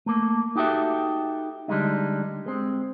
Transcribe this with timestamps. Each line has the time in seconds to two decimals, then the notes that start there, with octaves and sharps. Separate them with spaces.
0.06 A3 A#3
0.56 D#4 F#4 G4 A4 E5
1.68 D3 G3 G#3 D#4
2.46 G#3 C4